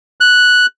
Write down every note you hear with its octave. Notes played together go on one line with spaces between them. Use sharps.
F#6